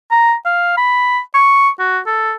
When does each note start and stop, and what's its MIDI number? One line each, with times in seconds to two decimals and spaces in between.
0.11 0.34 82
0.46 0.76 77
0.77 1.20 83
1.34 1.69 85
1.80 1.99 66
2.06 2.34 69